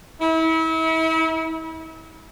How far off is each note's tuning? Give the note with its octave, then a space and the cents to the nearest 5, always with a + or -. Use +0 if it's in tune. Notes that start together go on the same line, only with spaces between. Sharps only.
E4 -35